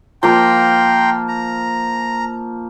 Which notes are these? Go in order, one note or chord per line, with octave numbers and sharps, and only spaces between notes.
F3 A#3 A#4 G5 A#5 C6
A#5